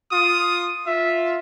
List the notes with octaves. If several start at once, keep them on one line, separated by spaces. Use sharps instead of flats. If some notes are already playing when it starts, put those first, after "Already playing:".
F4 D#6
F4 E5